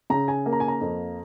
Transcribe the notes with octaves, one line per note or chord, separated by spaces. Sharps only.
C#3 A#5
G#5
A#3
A#5
G#5
A#5
F2